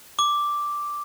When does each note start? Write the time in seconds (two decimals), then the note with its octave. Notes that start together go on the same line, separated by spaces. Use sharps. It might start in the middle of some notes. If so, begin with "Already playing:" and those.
0.19 D6